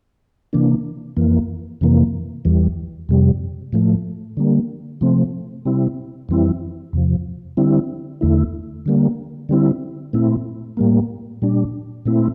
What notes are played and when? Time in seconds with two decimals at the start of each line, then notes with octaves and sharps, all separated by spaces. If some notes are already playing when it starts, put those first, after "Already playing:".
0.53 C3 E3 A#3 D4
1.16 F2 E3 A#3
1.81 F2 C3 E3 A#3
2.45 E2 E3 G3
3.09 F2 C3 G3
3.73 A2 F3 A3
4.37 D3 G3 A#3
5.01 C3 F3 A3 C4
5.65 C3 G3 C4 E4
6.29 F2 E3 G3 C4 E4
6.93 E2 C3 F3
7.57 D3 G3 C4 E4
8.21 E2 D3 A3 E4
8.86 D3 G3 A#3
9.49 D3 G3 C4 E4
10.13 A#2 A3 C4 E4
10.77 A2 G3 A#3
11.42 A#2 G3 D4
12.05 A#2 A3 C4 E4